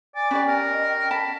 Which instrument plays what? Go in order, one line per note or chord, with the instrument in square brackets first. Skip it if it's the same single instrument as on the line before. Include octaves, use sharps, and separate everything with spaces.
[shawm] D5 [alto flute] G#5
[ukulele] C#4 G4 D5 [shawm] B4
[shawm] A#4
[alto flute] D#5
G5
[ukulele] A5 [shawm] B5